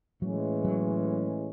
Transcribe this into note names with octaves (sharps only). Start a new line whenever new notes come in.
A2 E3 F#3 G#3 C#4
F#3